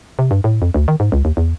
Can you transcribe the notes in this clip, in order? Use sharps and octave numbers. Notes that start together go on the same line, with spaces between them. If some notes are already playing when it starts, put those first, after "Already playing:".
C3
G2
A2
F2
D2
D#3
G#2
C#2
D#2
E2